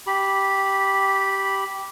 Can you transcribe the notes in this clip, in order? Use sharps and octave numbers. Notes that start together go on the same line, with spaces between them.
G4 B5